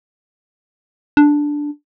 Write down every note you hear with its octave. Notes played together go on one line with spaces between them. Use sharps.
D4